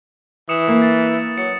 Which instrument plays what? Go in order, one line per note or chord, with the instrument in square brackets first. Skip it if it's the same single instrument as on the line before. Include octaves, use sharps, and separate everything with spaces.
[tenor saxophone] E3 [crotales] D#6 C#7 E7
[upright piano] A#3
[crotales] A6
[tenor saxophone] F#3 [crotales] C#7